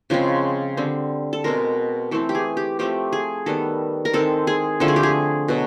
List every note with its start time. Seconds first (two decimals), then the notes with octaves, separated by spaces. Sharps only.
0.10 C#3 F3 G#3 C4
0.77 D3 G3 C4
1.33 A4
1.44 B2 G#3 C4 A#4
2.11 E3 A3 C4 A4
2.29 G4
2.35 G#4
2.57 G4
2.79 F3 A3 C4 G4
3.13 G#4
3.46 D#3 G3 B3 A4
4.05 A#4
4.14 D#3 G#3 C4 A4
4.47 G#4
4.80 D3 F3 A3 C4 A4
4.88 G#4
4.96 G4
5.03 G#4
5.48 B2 F#3